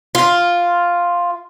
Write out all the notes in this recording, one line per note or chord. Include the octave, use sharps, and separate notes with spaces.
F4